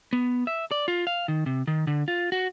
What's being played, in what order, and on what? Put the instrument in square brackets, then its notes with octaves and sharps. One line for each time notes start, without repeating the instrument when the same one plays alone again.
[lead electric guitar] B3
E5
D5
F4
F5
D#3
C3
D#3
D3
F4
F#4